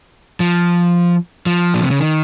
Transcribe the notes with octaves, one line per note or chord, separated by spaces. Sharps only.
F3
F3
A#2
C3
C#3
D#3